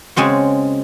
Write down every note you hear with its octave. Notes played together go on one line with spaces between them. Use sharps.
C#3 G#3 C4 F#4